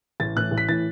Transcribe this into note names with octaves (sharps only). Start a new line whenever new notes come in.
A1 A6
A2 E3 F#6
A1
B6
A2 E3 A6